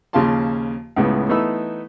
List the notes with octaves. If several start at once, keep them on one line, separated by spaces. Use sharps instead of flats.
D#2 C#3 F3 F4 A5 C6
C#2 A2 C#3 B3
E3 A3 B3 D#4 B5 E6